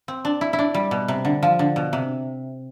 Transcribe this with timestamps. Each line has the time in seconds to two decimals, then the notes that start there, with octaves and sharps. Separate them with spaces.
0.08 C4
0.25 D4
0.41 E4
0.53 E4
0.59 D4
0.74 G3
0.91 B2
1.08 C3
1.25 D3
1.43 F3
1.59 D3
1.76 B2
1.93 C3